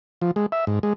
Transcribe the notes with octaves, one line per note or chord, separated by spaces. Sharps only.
F3
G#3
E5
G#2
G#3